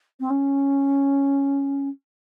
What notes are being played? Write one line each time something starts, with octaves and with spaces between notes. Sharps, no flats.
C4
C#4